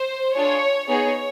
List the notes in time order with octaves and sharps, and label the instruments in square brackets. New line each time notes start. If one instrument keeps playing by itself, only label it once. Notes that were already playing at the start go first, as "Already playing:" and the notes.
Already playing: [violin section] C5
D4 F4 G#4 C#5
B3 D#4 G#4 C#5